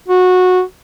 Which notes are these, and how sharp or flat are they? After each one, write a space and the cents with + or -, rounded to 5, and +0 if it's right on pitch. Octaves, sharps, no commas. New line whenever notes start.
F#4 -15